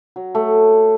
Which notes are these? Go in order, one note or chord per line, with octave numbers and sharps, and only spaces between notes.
F#3
A3